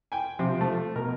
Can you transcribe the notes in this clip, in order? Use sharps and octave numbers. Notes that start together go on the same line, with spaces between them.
G5 G#5
C3 F3
A3
B2 A#4